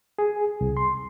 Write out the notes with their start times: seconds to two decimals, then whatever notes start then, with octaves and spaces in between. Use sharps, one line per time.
0.19 G#4
0.61 C2
0.77 C6